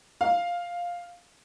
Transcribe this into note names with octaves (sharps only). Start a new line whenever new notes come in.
F5